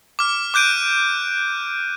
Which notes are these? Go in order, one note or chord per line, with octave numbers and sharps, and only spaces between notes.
D6 F6
D6 F#6 G6 D7 D#7